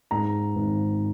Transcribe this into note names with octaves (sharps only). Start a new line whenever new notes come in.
G#2 A#5
G#1